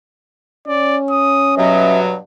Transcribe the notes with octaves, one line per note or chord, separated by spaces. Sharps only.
C#4 D5
D#6
G2 B2 F#3 D#5 E5